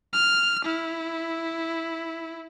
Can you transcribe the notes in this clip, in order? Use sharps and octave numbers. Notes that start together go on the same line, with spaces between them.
F6
E4